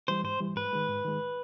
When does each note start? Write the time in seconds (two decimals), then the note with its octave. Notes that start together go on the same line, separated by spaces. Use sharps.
0.08 E3 G3 C5
0.24 G#2 C5
0.41 E3 G3
0.56 G#2 B4
0.73 D#3 G#3
0.88 G#2
1.05 D#3 G#3